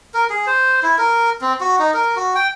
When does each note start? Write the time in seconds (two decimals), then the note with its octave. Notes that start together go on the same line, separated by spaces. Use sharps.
0.14 A#4
0.30 G#4
0.47 C5
0.83 E4
0.98 A#4
1.41 C4
1.61 F#4
1.79 D#4
1.94 A#4
2.16 F#4
2.35 G5